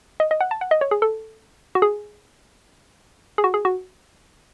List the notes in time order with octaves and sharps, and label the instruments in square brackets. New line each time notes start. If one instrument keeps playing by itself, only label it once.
[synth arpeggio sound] D#5
D#5
F#5
A5
F#5
D#5
C#5
G#4
A4
F#4
G#4
G#4
F#4
G#4
F#4